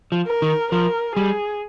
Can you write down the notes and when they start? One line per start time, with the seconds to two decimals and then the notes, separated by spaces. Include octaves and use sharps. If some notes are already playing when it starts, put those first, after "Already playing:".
0.12 F3
0.27 A#4
0.42 D#3
0.72 F3 A#4
1.15 G3 G#4